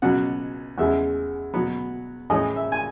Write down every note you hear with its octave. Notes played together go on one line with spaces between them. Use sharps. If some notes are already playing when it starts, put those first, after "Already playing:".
C#2 B2 F#3 F#5
E2 C#3 G#3 E5
B2 F#3 B3
A2 E3 G#3 C#4 D#5
E5
G#5